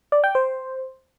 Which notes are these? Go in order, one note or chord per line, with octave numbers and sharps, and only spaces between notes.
D5
G5
C5